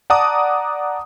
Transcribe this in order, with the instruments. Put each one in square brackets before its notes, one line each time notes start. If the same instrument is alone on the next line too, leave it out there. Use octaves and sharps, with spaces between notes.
[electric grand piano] D5 F#5 A5 A#5 D6 D#6